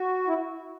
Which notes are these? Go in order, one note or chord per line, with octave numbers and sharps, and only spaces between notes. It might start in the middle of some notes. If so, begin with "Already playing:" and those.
Already playing: F#4
E4